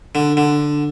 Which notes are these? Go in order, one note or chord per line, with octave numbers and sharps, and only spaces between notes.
D3
D3